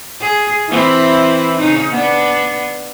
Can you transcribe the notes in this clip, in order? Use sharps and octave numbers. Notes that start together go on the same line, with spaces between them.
G#4
E3 C4 E4
C#3 D#4
B3 D4